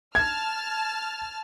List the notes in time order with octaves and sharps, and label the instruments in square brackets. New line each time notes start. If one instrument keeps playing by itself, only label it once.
[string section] A5 F6 [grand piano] G#6